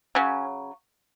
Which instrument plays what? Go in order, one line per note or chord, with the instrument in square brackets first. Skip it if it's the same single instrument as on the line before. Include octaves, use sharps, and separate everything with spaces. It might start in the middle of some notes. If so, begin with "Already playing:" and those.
[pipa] C#3 F#3 C#4